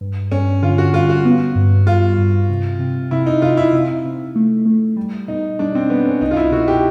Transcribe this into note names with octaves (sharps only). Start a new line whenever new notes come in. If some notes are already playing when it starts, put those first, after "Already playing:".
G2
G2 C#4
D3 F4
F#4
G3 F4
F#4
B3
G2
G3 F4
G2
C3
C3
C3 E4
D#4
C3 F4
E4
C3
C3
A3
A3
G3
B2 D#4
G3 D4
C4
G3 B3
C#4
C2 D#4
F4
E4
B2 F#4
G4